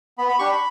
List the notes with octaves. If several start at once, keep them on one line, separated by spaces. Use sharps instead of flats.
B3 B5
B5
D4 G4 C#6
B5